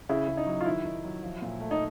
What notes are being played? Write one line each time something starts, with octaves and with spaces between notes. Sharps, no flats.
C#3 E4
C#3
D#4
F#3
F4
D#3 E4
D#3
F#3
F3
A#2
A3
D#4